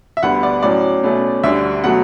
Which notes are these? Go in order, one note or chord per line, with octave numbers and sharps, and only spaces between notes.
E5
D2 D3 G3 B3 F#5
D5
A2 F#3 C#4 D5
B2 A3 C#4
D2 D3 G3 E5
B2 F#3 A3 F#5